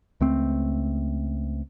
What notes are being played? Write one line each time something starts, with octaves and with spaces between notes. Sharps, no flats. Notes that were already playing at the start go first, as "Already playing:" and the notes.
C#2 A3 C4